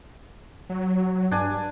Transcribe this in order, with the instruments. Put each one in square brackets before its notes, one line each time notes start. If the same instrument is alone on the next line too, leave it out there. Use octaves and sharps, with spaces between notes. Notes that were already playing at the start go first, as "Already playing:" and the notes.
[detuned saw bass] F#3
[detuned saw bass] G2 [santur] D4 G#5